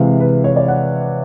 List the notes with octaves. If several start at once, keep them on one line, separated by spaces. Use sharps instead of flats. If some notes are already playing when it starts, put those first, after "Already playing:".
Already playing: C3 E3 G#3 F5
B4
C#5
D5
F#5